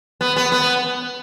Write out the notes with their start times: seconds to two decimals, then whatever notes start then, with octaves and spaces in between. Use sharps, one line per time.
0.21 B3
0.36 B3
0.52 B3